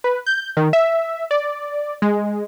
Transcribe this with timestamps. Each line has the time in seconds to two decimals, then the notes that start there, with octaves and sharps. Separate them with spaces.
0.04 B4
0.26 G6
0.57 D#3
0.73 E5
1.31 D5
2.02 G#3